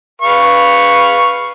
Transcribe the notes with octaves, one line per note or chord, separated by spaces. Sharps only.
B4 F5 C#6